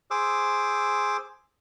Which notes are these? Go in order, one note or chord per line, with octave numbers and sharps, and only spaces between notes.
G#4 C5 D6 E6